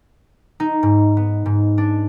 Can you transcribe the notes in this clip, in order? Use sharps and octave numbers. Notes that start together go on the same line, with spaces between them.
D#4
G#2
B3
G#2
D4